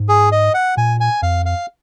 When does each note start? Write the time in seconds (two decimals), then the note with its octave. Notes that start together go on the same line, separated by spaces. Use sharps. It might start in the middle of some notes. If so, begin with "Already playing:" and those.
Already playing: G#2
0.09 G#4
0.32 D#5
0.54 F#5
0.77 A#2 G#5
1.00 G#5
1.22 F2 F5
1.46 F5